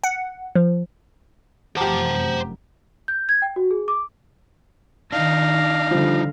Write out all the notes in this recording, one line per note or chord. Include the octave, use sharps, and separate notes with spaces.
F#5
F3
F1 F#2 G4 C5 F#5 A5 A#5 D6
G6
G#6
G5
F#4
G#4
D6
D#3 D4 D#4 F5 A#6
D3 F3 G3